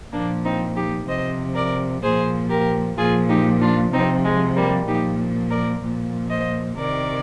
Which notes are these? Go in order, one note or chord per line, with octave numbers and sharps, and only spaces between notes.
A#2 F3 A#3 D4
C4 D#4
D#4 G4
C3 F3 C5 D#5
A#4 D5
A#2 F3 G#4 C5
G4 A#4
A#2 F3 F4 G#4
D#4 G4
D4 F4
C3 F3 C4 D#4
G#3
G3 A#3
A#2 F3 D#4 G4
A#4 D5
A#2 F3
C5 D#5
C3 D#3 A#4 D5